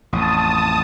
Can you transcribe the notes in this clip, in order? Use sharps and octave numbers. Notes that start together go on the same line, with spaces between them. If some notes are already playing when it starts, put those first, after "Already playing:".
A1 F2 A5 D#6